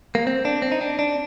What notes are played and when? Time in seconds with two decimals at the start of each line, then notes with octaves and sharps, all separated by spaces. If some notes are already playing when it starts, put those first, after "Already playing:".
0.15 A#3
0.27 C4
0.45 D4
0.62 C4
0.72 D#4
0.81 D4
0.99 D4